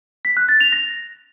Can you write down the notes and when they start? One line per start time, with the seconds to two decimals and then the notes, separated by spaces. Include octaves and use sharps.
0.25 B6
0.37 F#6
0.49 A6
0.61 F7
0.72 A#6